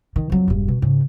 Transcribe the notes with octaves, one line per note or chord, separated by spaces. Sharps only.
D#3
F2 F#3
E1 G2
B2
G#2 C#3